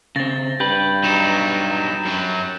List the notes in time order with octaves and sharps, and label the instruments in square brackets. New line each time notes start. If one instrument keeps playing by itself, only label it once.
[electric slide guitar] C#3 C4 [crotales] A6 A#6
[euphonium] G2 [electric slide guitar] G4 B4 [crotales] G6
[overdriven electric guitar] F#3 D#4 [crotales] E7
[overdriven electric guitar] F#2 F#3